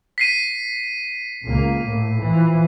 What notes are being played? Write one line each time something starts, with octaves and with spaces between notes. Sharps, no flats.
B6 C7 D#7
C#2 A#3
A2
E3 F3